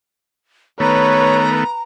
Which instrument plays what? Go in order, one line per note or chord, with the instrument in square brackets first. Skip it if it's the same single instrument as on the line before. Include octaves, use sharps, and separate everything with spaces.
[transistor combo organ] D#3 A3 B3 [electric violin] B4 [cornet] C#5 [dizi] A#5